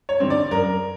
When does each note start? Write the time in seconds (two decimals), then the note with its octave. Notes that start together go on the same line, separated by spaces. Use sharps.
0.09 C#5
0.20 D3 G3 C4
0.30 D5
0.51 F#2 A#4